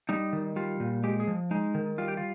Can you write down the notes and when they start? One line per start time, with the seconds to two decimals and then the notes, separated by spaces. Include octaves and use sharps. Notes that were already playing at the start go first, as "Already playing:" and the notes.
0.09 G3 D#4
0.33 D#3
0.56 G3 F4
0.80 A#2
1.03 G#3 G4
1.20 G#4
1.27 F3
1.51 G#3 D#4
1.75 D#3
1.98 G3 F4
2.08 G4
2.17 F4